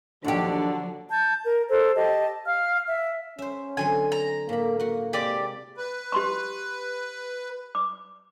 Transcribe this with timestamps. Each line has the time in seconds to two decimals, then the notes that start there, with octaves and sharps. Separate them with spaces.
0.24 D#2 D3 F3 F#3 D4 G4
1.11 A5 G6
1.45 A#4
1.69 A4 C5
1.96 G4 D#5 A5
2.45 F5 F6
2.88 E5
3.39 C#4 C5 E5
3.77 D3 F#3 C4 G#5
4.12 A#5
4.49 A2 A#3 B5
4.80 A#3 F#4 F#5
5.13 C3 G#3 G4 D5
5.78 B4
6.12 G4 C6 C#6
7.75 D6